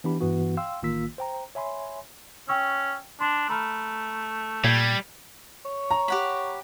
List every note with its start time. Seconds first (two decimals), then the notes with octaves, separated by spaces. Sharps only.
0.04 E3 B3 D4 G4 B5
0.21 G2 E3 B3 F#4
0.57 F5 G5 C6 E6
0.83 A1 D#3 A#3 F4 E6 B6
1.18 C5 G5 A#5
1.55 C#5 E5 G#5 B5 C6
2.49 C#4 G5 C#6 E6
3.20 D4 C6
3.49 A3 A#5 B5 F6
4.64 A#2 G3 G6 G#6 C7
5.65 C#5
5.91 A#5
6.08 G4 F#5 B5